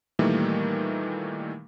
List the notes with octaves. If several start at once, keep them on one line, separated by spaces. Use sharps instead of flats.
A#2 D#3 E3 G3 A3 A#3